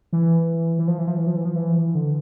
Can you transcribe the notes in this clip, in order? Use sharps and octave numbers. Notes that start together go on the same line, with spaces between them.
E3
E3
F3
E3
F3
E3
F3
E3
F3
E3
E3
D3